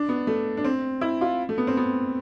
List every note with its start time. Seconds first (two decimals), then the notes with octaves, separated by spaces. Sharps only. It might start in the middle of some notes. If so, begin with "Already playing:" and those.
Already playing: D4
0.09 B3
0.27 A3
0.57 D4
0.64 C4
1.01 E4
1.21 F4
1.49 A3
1.58 B3
1.67 C4
1.77 B3